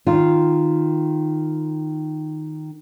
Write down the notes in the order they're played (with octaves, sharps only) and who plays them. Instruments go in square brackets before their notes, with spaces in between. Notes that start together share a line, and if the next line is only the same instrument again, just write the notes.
[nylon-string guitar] D#3 F4